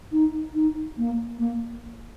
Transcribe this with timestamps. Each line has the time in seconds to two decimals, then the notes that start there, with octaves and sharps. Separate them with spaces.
0.12 D#4
0.55 D#4
0.97 A#3
1.39 A#3